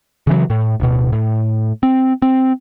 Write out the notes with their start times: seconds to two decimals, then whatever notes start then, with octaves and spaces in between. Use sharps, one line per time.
0.27 C#3 E3 F#3
0.50 A2
0.80 D1 B2
1.13 A2
1.83 C4
2.22 C4